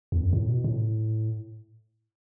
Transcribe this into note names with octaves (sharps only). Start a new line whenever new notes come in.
E2
F#2
A2
B2
A2